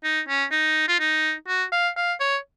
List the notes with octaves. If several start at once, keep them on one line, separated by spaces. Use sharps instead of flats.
D#4
C#4
D#4
F4
D#4
F#4
F5
F5
C#5